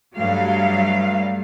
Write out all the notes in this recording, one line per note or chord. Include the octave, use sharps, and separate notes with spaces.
G2 F#3 G3 A3 F5